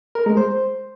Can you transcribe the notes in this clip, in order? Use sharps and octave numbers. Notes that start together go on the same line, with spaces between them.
A#4
G#3
C5